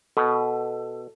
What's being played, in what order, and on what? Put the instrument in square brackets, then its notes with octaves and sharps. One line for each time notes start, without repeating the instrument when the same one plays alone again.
[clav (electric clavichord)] B2 [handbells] A4